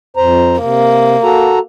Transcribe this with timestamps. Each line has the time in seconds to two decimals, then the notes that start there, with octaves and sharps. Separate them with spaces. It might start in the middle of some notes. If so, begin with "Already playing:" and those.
0.17 F2 C5 A#5
0.61 C3 A#3
1.23 F#4 A4 A#5